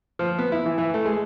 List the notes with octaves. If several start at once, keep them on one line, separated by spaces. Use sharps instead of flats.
F3
B3
E4
E3
E3
A3
G#3